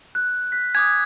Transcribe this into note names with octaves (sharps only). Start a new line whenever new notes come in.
F#6
F#6 B6
G#5 D6 D#6 G#6